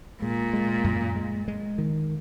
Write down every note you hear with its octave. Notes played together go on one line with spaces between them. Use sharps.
A#2 G#3
G#3
F#2
G#3
G#3
D#3